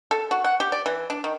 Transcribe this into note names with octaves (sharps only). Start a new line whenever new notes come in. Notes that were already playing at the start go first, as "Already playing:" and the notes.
A4
F#4
F#5
G4
D5
E3
D4
D#3